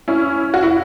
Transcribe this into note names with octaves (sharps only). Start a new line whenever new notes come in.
C#4 E4
F#4
E4